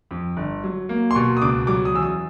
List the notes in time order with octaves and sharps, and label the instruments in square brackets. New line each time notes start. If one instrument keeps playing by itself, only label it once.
[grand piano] F2
G1
F#3
A#3
C6
B2 C#6
D#6
C#2 D6
F#3 D6
D#6
E2 E6
D#6